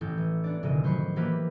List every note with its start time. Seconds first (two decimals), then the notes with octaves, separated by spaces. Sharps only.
0.01 A1 A2 G6
0.18 E3
0.44 B3 D4 D5
0.63 F1 D3 D#3 D#5 D#7
0.84 F#3 C5 B5 C#6
1.16 E3 F3 A#3 G4 A#4 B4